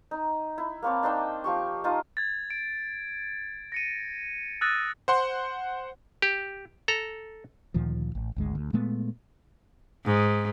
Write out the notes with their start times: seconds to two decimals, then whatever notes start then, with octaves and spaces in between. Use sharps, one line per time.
0.11 D#4
0.58 E4
0.82 A#3 C4 C#5 A5
1.03 D4 D#4 C5 G5
1.44 F3 G4 C#6
1.84 D#4 F4 D#5 A5
2.17 G#6 A6
2.50 D7
3.72 A#6 C#7 D#7
4.61 D#6 E6 F#6 A6 A#6 D#7
5.08 C5 F#5 C6
6.22 G4
6.88 A4 A#5
7.74 D2 A#2 D#3 F3
8.15 A1
8.36 G#1 D2 G#3
8.55 D2
8.73 A#2 G#3 A3 B3
10.05 G#2